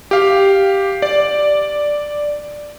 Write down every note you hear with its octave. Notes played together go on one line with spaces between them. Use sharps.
G4 F5
D5